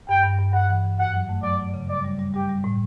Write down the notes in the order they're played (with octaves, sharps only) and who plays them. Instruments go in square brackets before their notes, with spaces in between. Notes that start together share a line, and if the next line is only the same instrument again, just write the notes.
[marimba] G2 [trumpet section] G5
[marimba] G2
G2
[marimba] G2 [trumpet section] F#5
[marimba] E3
E3
[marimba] F#2 [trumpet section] F#5
[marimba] F#3
A3
[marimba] F#3 [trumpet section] D5
[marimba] F#3
C#3
[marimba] G3 [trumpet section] D5
[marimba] G3
G3
[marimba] G3 [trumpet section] G4
[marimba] G3
A2